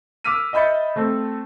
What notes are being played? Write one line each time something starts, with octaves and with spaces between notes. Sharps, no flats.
D6 E6 F6 B6 D#7
D#5 E5 B5 G6 A6 C#7
A3 C4 A4